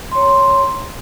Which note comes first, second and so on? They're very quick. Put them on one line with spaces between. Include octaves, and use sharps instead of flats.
C6 C#5 A#5